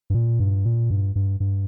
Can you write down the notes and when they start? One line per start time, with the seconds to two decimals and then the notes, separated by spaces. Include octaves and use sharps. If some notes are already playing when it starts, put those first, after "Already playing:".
0.10 G2
0.14 A#2
0.40 G2
0.65 A#2
0.90 G2
1.15 G2
1.40 G2